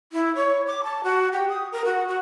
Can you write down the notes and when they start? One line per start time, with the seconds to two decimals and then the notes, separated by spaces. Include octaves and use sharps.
0.12 E4
0.35 C#5
0.67 D6
0.84 A5
1.04 F#4
1.32 G4
1.49 D#6
1.72 A#4
1.85 F#4
2.08 F#4